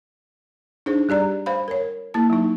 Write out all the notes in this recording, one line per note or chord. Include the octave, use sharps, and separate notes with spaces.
D4 D#4 G#4 C5
G3 G4 D5 A#5
C5 F5 B5
A#4 C#5
A#3 E4 A5
F#3 D#4